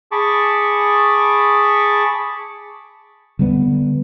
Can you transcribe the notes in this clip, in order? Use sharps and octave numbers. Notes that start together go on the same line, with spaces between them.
G#4 A5 B5 C#6 D6
D3 G3 B3